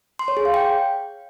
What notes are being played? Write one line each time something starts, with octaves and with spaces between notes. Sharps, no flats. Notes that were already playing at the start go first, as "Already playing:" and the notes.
C6
C#5
G#4
F5
G5